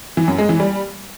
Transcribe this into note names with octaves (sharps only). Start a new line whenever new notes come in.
E3
F#2
G#3
E3
G3